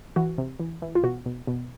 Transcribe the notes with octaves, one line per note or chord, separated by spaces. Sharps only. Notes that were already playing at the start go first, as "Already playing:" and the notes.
E3 F#4
C3
E3
E3
F4
B2 F#4
B2
B2